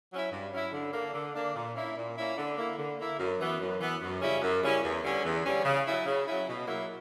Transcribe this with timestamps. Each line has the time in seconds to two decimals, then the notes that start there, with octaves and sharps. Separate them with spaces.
0.11 F#3 C#4 E4
0.31 G2
0.53 F#3 C#4 E4
0.73 D3
0.93 A#3 D4
1.14 D3
1.35 A#3 D4
1.55 A#2
1.75 A#3 C#4 E4
1.97 A#2
2.17 A#3 C#4 E4
2.38 D3
2.58 A#3 E4
2.79 D3
2.99 A#3 E4
3.19 F#2
3.40 E3 B3
3.60 F#2
3.81 E3 B3
4.02 F#2
4.21 C#3 G3 C#4 E4
4.42 F#2
4.62 C#3 G3 C#4 E4
4.84 E2
5.04 D3 G3 C#4
5.24 E2
5.45 D3 G3 C#4
5.65 C#3
5.85 F#3 C#4 E4
6.06 C#3
6.26 F#3 C#4 E4
6.47 B2
6.68 F#3 A#3 E4